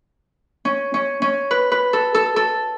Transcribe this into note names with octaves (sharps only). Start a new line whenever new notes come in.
C#4
C#4
C#4
B4
B4
A4
A4
A4